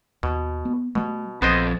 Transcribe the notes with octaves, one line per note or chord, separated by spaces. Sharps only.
D#2 B2
B3
B2 G3 A3
A#1 F2 B3 C5 D#5